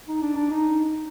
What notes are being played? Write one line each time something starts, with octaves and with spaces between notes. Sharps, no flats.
D#4
D4
D4
D#4